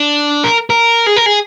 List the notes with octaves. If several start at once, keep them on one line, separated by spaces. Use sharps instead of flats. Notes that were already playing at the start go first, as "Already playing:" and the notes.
Already playing: D4
A#4
A#4
G#4
A#4
G#4